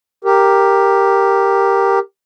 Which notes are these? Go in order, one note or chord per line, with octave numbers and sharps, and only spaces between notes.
G4 A#4